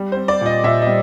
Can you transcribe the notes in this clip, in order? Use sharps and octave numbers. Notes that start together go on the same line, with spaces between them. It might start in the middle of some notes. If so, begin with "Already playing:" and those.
Already playing: G3
C4 C5
D5
A#2 D#5
A#2 E5
G3 D#5